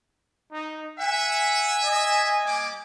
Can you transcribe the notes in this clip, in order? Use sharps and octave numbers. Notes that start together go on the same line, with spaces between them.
D#4
E5 F#5 G#5
D#5
G3 A#3 D6